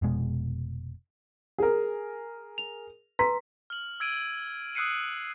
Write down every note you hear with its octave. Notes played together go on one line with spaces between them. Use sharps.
F1 B2 G#3
G#4 A#4
F7
B4 A#5 C6 B6
F6 F#7
E6 G#6 D7 D#7
D#6 E6 F#6 C7 C#7 D#7